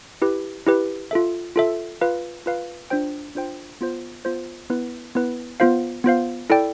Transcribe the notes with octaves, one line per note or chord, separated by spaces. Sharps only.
E4 G4 B4
E4 G4 B4
F4 A4 E5
F4 A4 E5
F4 B4 F5
F4 B4 F5
D4 F4 C5 G5
D4 F4 C5 G5
B3 F4 C5
B3 F4 C5
B3 E4 B4
B3 E4 B4
B3 F4 C5 F5
B3 F4 C5 F5
E4 A4 D5 G5